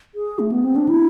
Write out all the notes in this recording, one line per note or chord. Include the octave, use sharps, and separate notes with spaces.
G#4
A3
B3
C4
D4
E4